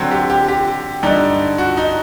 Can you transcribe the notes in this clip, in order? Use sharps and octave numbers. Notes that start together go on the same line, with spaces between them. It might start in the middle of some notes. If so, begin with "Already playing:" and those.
Already playing: D3 F#3 C4
G4
G4
G4
G2 D3 G3 D4 D#4
F#4
D#4